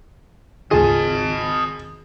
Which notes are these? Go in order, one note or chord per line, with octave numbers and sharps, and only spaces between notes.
G#1 D2 C#3 F4 G#4 D#5 A5